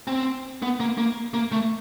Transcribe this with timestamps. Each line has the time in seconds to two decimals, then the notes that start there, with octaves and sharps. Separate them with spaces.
0.07 C4
0.62 B3
0.80 A#3
0.98 A#3
1.34 A#3
1.52 A3